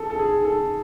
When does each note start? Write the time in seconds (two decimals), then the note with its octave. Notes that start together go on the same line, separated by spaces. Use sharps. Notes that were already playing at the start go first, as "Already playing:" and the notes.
Already playing: G#4 A4
0.10 A4
0.19 G#4
0.45 A4